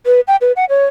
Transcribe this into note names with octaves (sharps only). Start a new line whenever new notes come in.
B4
G5
B4
F#5
C#5